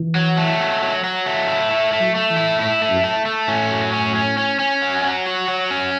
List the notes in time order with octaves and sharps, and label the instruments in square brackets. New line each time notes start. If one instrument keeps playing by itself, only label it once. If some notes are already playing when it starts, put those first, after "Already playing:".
Already playing: [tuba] E3
[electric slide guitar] F#3
A3
F#3
F#3
F#3
A3
E4
A3
A3
[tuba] F#3
[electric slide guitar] A3
[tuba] E3
[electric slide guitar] E4
[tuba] A2 [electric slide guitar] E4
[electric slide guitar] A3
[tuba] F#2
[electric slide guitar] A3
A3
[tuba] A2 [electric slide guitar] C#4
[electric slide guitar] F#3
C#4
C#4
C#4
C#4
F#3
F#3
F#4
F#3
C#4